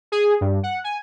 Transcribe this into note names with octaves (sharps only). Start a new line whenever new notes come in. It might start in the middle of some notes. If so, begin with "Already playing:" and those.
G#4
G2
F#5
G#5